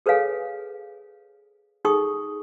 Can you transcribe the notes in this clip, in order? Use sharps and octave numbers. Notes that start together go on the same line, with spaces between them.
G#4 A4 B4 C#5 F5 G#5
D#4 G#4 A4 G5 C#6 D#6